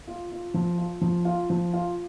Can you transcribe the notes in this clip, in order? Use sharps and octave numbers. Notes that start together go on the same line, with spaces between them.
F4
F4
F3
F4
F3
F4
F3
F4